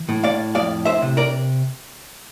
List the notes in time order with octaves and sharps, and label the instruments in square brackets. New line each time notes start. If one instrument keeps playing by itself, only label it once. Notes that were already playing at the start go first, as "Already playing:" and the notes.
Already playing: [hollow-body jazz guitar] E3
A2
D5 F5
F2 D5 F5
C5 E5
C3
A#4 D5